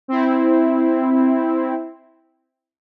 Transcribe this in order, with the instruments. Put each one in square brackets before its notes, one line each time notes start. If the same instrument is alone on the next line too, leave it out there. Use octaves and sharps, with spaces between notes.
[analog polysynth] C4 E4